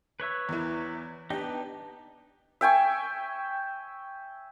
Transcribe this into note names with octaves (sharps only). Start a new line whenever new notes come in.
B4 C#5 E5
E2 E3
B3 D4 D#4 G4
E5 G5 G#5 C#6